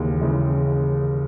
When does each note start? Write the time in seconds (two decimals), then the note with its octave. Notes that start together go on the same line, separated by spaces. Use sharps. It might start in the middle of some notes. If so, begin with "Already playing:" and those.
Already playing: D#2 C#3 E3 G#3
0.21 C#3 E3 G#3